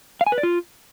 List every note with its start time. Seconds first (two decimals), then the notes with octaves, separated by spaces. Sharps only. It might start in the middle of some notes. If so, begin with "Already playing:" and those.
0.21 F5
0.27 G#5
0.32 B4
0.38 D5
0.43 F4